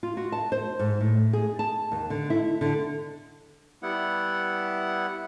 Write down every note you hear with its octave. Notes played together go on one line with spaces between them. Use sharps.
F4
F#4
A5
C5
G#2
A2
G#4
A5
D#2
D3
E4
D3
G3 B3 E4 F#5